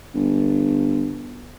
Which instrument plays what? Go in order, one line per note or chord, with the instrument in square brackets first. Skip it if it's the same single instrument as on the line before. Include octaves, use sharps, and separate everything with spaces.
[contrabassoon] G1